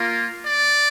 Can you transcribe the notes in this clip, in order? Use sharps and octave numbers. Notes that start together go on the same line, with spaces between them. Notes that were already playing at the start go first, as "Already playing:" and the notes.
Already playing: A#3 F4
D5